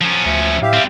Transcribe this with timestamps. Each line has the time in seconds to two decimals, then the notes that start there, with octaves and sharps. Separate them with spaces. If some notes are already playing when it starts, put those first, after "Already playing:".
0.01 F3 F#3 C#4
0.26 D2 E5
0.62 A2 G4 E5 F5
0.73 G3 C4